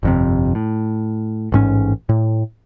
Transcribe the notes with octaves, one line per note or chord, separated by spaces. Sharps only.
G1 F2 C3
A2
A1 G#2 C#4
A2